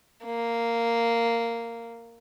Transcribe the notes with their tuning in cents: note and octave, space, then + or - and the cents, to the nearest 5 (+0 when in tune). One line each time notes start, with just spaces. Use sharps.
A#3 -10